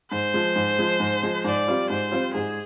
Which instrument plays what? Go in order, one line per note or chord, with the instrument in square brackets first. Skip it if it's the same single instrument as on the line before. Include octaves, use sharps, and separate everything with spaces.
[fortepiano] G#2 [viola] C5
[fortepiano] F3 G#3
G#2
F3 G#3
G#2
F3 G#3
[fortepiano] G#2 [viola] D5
[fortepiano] G3 C4 F4
[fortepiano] G#2 [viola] C5
[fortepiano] G3 C4 F4
[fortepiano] G#2 [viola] G#4